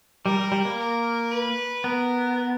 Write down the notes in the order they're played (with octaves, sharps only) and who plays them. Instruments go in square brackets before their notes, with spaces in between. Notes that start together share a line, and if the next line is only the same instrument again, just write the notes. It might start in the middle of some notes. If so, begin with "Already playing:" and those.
[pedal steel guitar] G3 [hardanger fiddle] A#4
[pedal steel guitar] G3
G3
A#3
[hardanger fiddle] A#4
B4
[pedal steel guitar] B3 [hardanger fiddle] A#4